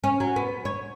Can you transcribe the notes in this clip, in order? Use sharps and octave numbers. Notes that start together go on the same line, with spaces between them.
C#4
F#3
B3
C#5